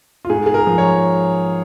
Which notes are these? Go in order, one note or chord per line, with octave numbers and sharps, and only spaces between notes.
F4
G#2 G#4
G#4
A#4
F3
C#5